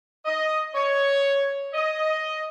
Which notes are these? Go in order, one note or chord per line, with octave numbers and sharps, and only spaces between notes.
D#5
C#5
D#5